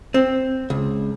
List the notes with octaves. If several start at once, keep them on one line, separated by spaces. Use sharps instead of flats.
C4
C#2